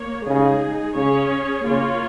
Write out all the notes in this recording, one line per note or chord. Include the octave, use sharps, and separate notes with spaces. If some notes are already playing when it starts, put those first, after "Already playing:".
Already playing: A#3 C#5
C#3 G#3 D#4 G#4
C#3 C#4 G#4 C#5
C#3 A#3 F4 C#5